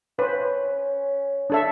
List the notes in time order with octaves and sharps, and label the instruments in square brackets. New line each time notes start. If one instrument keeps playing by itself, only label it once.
[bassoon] C#4 [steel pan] B4 C5
[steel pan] D4 A4 E5